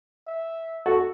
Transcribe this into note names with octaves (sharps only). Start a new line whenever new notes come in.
E5
F#4 A4